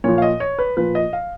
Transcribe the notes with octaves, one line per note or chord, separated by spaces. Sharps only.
A#2 F3 C#5
F5
D#5
C#5
B4
A#2 F3 B4
D#5
F5